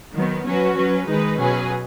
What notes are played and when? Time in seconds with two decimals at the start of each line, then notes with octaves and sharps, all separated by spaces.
0.15 D#3 F#3 B3
0.46 F#3 C#4 F#4 B4
0.77 F#3 C#4 B4
1.09 D#3 G#3 D#4 B4
1.40 B2 F#3 C#4 G#4 B4